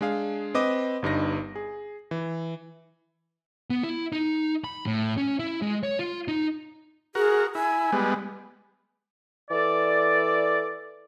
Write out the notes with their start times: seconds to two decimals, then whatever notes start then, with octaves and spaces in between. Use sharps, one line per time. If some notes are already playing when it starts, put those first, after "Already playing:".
0.01 G#3 D4 G#4 F5
0.54 C4 B4 D#5 D6 D#6
1.02 G1 G2 D#4 A#6
1.55 G#4
2.11 E3
3.70 B3
3.83 E4
4.13 D#4
4.64 B5
4.87 A2
5.18 C#4
5.39 E4
5.62 G#3
5.83 C#5
5.99 F4
6.28 D#4
7.15 F#4 G#4 A#4
7.55 E4 G#5
7.92 G3 G#3 B3
9.49 E3 A4 D5